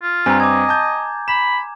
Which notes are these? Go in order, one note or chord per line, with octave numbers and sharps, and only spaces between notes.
F4
G2 C4 G#5 A#5
D#5 D6 G#6
A5 G6
B5 E7